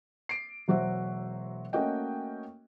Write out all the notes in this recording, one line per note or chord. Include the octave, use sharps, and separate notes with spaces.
C7 D7
E1 F#3 F#4 C5 E5
A3 A#3 C#4 F#4 D#5 G5